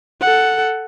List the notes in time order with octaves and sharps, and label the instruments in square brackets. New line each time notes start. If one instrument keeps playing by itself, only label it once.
[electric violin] A4 F#5